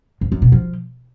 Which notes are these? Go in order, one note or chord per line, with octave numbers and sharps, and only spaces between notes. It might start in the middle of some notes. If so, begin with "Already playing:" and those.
F2
F#2
B2
F3